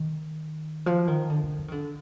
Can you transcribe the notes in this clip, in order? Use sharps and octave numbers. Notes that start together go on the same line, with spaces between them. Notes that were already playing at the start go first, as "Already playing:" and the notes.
Already playing: D#3
F3
D#3
D3
D3
F3
D#3
D3